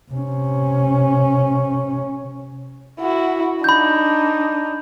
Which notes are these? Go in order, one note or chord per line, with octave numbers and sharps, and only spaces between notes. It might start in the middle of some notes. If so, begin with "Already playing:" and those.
C3 C#4
E4 F#4
D4 D#4 B5 G6